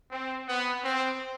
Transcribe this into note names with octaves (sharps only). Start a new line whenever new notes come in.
C4
B3
C4